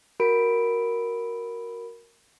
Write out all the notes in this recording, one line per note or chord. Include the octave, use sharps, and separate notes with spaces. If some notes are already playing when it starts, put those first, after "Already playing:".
F#4 A#4 B5 D7